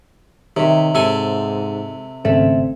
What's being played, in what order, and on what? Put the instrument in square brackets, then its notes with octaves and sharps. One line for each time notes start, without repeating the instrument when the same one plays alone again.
[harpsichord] C3 [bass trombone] D#3 [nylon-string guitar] C#5 E5
[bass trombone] G#2 [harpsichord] C3 A4 G#5
[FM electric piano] G#1 C#3 A3 [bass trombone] C4 [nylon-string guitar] D5 E5